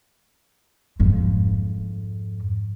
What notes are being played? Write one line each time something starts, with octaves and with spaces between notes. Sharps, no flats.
F2 G#2